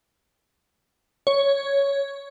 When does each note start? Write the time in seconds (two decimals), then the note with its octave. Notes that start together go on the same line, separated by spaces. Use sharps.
1.27 C#5